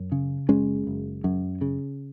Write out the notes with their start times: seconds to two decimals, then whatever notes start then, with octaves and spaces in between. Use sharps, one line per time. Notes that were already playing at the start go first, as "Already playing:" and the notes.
Already playing: F#2
0.12 C#3
0.49 F#1 G#3 C#4
0.87 F#1
1.24 F#2
1.61 C#3